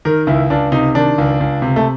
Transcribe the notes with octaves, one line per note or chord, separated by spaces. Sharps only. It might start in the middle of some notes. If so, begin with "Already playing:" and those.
D#3 A#4
C#2 E4
C#2 D4
C3 D#4
D#3 D4
C#2
C#2
C3
A3